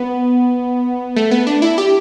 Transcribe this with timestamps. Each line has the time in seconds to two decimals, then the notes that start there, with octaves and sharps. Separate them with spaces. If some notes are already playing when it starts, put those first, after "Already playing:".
Already playing: B3
1.17 A3
1.31 B3
1.47 D4
1.62 E4
1.78 G4